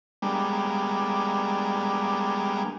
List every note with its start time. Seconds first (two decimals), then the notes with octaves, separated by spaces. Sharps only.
0.22 G3 G#3 A#3 B3 D4